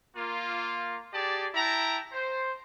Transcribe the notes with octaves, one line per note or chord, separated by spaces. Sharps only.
A#3 F4
G4 G#4 D5 A5
E4 G5 A5 A#5
C5